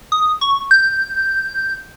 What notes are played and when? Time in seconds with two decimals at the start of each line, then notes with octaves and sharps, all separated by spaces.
0.12 D#6
0.41 C#6
0.71 G6